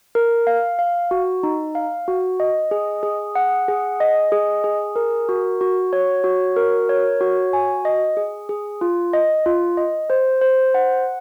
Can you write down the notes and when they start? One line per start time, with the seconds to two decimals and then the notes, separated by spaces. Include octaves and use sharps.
0.15 A#4
0.47 F5
0.79 F5
1.11 F#4
1.43 D#4
1.75 F5
2.08 F#4
2.40 D#5
2.71 G#4
3.03 G#4
3.35 F#5
3.68 G#4
4.00 D#5
4.32 G#4
4.64 G#4
4.96 A#4
5.29 F#4
5.61 F#4
5.93 C#5
6.24 F#4
6.56 A#4
6.89 C#5
7.21 F#4
7.53 G#5
7.85 D#5
8.17 G#4
8.49 G#4
8.81 F4
9.13 D#5
9.46 F4
9.77 D#5
10.10 C5
10.41 C5
10.74 F#5